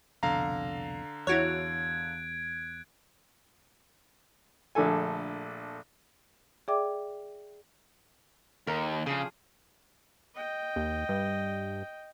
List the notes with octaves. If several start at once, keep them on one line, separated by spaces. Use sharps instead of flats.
C2 F2 B2 D3 F5 A#5
E2 E4 F#4 C#5 F#6 G#6 D7
A#1 D3 A3 A4 G#5
G#4 D5 E5 G5 D6
D#2 A#4
C#3 F3 D4 G#4
D#5 G5
D#2
G2